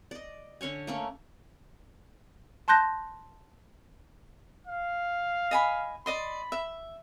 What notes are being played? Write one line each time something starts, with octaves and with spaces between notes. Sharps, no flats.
D5 D#5
D3 C#4 C#5 G#5
A3 A#3 C#4
A5 C6 F#6 G6 A#6
F5
D#5 G#5 B5
D5 D#5 B5 C6
E5